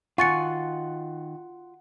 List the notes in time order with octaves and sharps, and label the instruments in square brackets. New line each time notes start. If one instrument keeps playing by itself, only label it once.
[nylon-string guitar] D#3 G#5 [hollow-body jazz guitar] F4 [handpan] F#5 [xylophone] C#6 A6 C#7